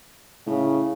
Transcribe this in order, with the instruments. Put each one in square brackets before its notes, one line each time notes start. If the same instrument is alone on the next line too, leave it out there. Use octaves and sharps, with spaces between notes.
[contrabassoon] A2 [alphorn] C#3